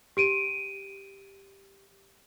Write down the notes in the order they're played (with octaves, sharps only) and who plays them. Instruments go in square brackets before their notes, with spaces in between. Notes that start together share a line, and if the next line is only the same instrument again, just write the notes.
[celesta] G4 D7 D#7